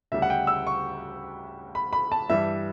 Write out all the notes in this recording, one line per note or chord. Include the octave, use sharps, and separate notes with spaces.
D2 C#3 G3 E5
F#5
G5
E6
C#6
B5
B5
A5
G2 E3 G3 E5